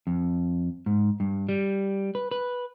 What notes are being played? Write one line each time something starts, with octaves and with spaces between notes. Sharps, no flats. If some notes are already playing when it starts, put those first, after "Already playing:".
F2
G#2
G2
G3
B4
B4